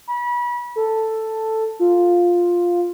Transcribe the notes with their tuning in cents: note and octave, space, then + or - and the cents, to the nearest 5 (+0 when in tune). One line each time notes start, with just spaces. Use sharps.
B5 -30
A4 +5
F4 +5